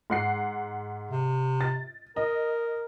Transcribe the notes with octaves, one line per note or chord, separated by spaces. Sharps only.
G#2 F#5 C7
C3
A6
A#4 D#5